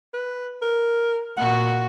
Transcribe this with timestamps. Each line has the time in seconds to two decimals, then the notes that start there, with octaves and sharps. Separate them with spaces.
0.14 B4
0.62 A#4
1.37 A#2 F#4 F#5